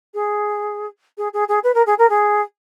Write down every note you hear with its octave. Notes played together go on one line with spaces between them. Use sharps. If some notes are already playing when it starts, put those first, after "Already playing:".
G#4
G#4
G#4
G#4
B4
A#4
G#4
A#4
G#4